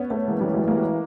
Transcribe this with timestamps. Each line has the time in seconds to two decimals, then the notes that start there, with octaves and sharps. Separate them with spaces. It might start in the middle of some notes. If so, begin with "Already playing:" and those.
Already playing: B3 C#4
0.10 A3 B3
0.28 E3 G#3 A#3
0.41 G3 A3
0.54 F#3 G#3
0.67 G#3 A#3